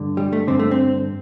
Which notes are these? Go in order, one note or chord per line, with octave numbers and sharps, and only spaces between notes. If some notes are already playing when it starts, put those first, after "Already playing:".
Already playing: G2 D3
G3
A3
G2 D3 C4
A3
C4